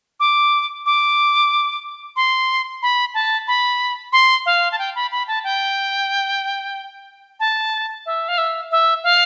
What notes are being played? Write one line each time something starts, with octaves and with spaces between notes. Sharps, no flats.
D6
D6
C6
B5
A5
B5
C6
F5
A5
G5
B5
B5
A5
G5
A5
E5
F5
E5
E5
F5